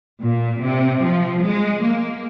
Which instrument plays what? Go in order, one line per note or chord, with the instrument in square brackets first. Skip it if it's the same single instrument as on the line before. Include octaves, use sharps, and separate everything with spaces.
[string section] A#2
C3
F3
G#3
A#3